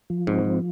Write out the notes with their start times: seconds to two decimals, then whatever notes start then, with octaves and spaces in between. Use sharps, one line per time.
0.10 F3
0.27 G#2 C4
0.45 F3